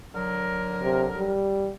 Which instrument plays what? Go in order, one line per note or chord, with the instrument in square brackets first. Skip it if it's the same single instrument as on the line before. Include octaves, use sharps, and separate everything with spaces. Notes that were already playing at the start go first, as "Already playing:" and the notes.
[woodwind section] D3 F#3 A#4
[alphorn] C3
G3